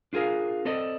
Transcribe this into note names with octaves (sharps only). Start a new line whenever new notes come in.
D4 F4 G#4 A#4 F5
C4 A4 D5 D#5